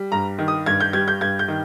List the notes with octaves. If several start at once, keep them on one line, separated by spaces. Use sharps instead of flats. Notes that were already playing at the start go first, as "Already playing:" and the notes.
Already playing: G3
G2 A#5
D#3
D#6
G2 G#6
G6
G3 G#6
G6
G2 G#6
G6
D#3